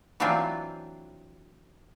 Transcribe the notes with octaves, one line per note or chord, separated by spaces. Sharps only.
E3 F#3 A3 C4 D4 F4